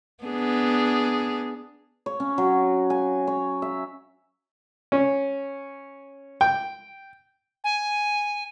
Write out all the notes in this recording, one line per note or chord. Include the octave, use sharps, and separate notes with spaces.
B3 D4 G#4
C#5
C#4
F#3
G#5
C#5
E5
C#4
G5
G#5